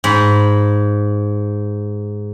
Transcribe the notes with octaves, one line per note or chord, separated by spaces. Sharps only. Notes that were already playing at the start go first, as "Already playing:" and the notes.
G#2 B5